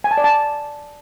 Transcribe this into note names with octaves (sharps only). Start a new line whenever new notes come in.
G#5
A5
D5
A5